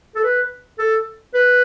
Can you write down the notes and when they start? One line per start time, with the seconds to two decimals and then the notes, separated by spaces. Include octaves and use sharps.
0.16 A4
0.24 B4
0.79 A4
1.34 B4